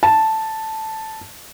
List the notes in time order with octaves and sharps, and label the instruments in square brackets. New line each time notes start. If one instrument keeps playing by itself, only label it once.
[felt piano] A5